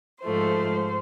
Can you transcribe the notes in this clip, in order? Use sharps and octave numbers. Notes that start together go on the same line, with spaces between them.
G#2 F3 A3 C5